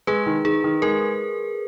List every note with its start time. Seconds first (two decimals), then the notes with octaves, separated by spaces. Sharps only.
0.07 G#3 G#4 B4
0.26 D#3
0.45 D#3 G#4
0.64 D#3
0.82 G#3 A#4